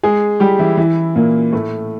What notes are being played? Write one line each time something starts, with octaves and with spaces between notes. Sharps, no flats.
G#3 G#4
G3 G4
E3 E4
E3 E4
A#2 A#3
A2 A3